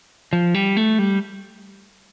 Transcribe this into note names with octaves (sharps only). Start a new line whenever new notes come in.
F3
G3
A3
G3